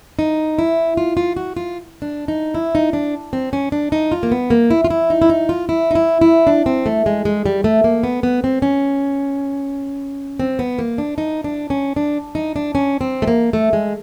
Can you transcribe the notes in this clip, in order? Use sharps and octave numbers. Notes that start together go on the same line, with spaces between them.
D#4
E4
F4
F4
F#4
F4
D4
D#4
E4
D#4
D4
C4
C#4
D4
D#4
F4
A#3
B3
A#3
E4
F4
E4
D#4
E4
D#4
F4
E4
D#4
E4
E4
D4
C4
A3
G#3
G#3
G3
A3
A#3
B3
B3
C4
C#4
C4
B3
A#3
D4
D#4
D4
C#4
D4
D#4
D4
C#4
C4
A3
A#3
A3
G#3